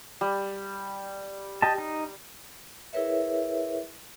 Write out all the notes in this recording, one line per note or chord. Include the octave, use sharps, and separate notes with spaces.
G3
G4 D#5 A5
D#4
E4 G#4 A#4 B4 C#5 E5